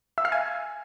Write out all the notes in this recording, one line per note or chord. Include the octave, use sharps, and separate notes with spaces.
E5
F5
G#5